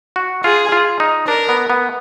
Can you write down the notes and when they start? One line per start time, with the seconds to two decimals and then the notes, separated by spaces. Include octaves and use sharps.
0.16 F#4
0.44 F4 G#4
0.72 F4
1.00 D#4
1.27 D4 A#4
1.49 B3
1.70 B3